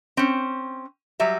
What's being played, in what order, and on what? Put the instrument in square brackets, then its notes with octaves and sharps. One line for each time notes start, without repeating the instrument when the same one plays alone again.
[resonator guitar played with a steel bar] C4 C#4
F#3 G3 E5